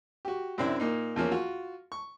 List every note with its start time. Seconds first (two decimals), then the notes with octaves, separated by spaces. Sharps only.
0.25 F#4 G4
0.58 F#2 C3 C4 D4 E4
0.80 A#2 A#3 D#4
1.16 E2 F3 A#3 C#4
1.32 F4 F#4
1.92 C#6